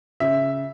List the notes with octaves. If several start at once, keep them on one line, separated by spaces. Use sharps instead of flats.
C#3 E5